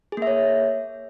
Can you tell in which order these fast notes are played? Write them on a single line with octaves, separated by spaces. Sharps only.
G#4 A#3 E5 C#5